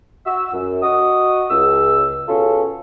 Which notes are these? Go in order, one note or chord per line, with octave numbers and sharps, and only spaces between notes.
F#4 E6
F#2
F#4 D#5 D#6
C#2 E6
B2 C#4 F4 G#4 A4